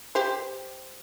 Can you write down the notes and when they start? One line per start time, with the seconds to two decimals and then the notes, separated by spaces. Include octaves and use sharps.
0.15 G4 C5